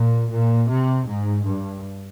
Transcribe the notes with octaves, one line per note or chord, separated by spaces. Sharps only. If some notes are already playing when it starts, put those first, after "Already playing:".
Already playing: A#2
A#2
C3
G#2
G2